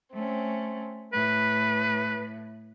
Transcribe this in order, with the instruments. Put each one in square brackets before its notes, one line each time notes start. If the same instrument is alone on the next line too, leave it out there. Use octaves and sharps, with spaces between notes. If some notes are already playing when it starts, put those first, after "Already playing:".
[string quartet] A3 C4 C#4
[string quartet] A2 [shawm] B4